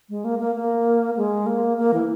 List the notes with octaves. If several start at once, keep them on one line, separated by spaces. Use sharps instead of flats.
G#3
A#3
A#3
A#3
G#3
A#3
A#3
E3